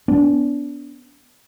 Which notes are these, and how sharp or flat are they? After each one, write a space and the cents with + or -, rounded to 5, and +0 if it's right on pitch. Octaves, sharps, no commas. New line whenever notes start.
B3 +0 D4 -30